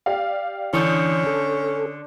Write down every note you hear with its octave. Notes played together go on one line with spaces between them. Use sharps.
G4 D5 F5
D3 E3 C#4 C6 D#6 G6
A4